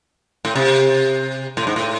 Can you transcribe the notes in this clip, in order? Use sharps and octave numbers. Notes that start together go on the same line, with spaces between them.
A2
C3
A2
G#2
A2